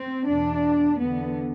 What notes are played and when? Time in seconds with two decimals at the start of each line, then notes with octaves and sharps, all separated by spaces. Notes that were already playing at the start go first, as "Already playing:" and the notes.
Already playing: C4
0.29 E2 B2 D4
1.01 E2 D3 B3